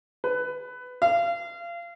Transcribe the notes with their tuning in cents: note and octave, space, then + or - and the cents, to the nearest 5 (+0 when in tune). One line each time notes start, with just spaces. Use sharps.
B4 +15
F5 -30